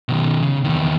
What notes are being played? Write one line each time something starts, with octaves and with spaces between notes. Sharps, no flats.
B2 D#3
C#3
E2 D#3